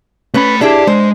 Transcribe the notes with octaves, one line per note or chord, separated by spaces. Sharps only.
A3 C#4 B4 B5
D4 E4 G4 G#4
G#3 C5